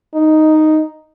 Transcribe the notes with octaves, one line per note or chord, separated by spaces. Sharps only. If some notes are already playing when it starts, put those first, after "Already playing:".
D#4